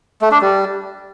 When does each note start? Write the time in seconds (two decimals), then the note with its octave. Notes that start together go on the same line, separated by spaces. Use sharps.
0.21 A3
0.31 D4
0.41 G3